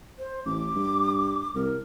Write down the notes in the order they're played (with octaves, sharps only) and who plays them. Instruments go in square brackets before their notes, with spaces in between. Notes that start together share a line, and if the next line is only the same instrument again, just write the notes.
[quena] C5
[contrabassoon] A1 [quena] D6
[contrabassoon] G2
[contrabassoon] C2 [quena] A#4